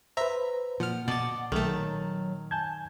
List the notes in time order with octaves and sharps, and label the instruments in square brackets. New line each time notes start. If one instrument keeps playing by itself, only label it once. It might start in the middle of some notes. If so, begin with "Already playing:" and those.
[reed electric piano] B4 C5 [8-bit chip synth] E5 A#5
[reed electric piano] A#2 [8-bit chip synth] F3 F6 [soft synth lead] F#5
[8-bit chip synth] B2 A6 [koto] D5 D#5 A5
[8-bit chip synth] B1 A3 [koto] D#3 A5 [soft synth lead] F#3
[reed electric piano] G#5 G6 G#6 [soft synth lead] A5